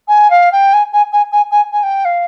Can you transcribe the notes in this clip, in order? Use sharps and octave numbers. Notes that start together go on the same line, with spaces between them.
G#5
F5
G5
G#5
G#5
G#5
G#5
G#5
G#5
G5
F5